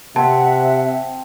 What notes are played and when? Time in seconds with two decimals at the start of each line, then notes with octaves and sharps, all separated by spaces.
0.16 C3 C4 E5 F#5 A5